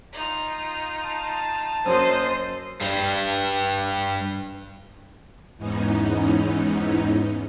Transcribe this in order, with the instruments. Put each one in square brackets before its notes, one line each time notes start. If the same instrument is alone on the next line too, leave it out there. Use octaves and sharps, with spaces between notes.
[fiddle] D#4 F4
[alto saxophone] A5
[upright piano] F#2 F#3 A#3 [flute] C5 [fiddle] D#5 D#6
[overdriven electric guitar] G2 G3
[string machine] E2 G#2 E3 B3 C#4 D#4